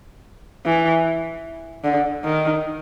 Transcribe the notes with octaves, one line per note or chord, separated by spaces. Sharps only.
E3
D3
D#3